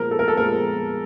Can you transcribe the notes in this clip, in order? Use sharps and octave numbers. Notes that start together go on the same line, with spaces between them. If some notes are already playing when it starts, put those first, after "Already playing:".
Already playing: A#2 F3 G#3 B3 A#4
A4
A#4
A4
A#2 F3 G#3 B3 A#4